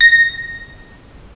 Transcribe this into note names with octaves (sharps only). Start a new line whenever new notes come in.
A#6